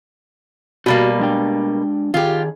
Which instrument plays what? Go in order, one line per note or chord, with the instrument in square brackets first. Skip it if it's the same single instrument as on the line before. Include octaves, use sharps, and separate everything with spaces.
[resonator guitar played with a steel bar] B2 G3 A#3 [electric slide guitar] F#4
[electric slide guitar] G#3 D4 G5
[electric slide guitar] D#3 G#4 [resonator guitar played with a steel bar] F4 G4